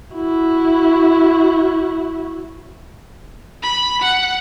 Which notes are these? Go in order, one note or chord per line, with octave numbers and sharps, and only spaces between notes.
E4 F#4
B5
F#5